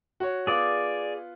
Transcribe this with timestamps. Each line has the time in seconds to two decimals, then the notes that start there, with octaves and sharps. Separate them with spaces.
0.20 F#4 C#5
0.47 B3 F4 G#4 D5